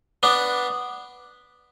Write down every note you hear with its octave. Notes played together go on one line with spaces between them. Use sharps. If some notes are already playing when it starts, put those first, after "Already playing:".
B3 D4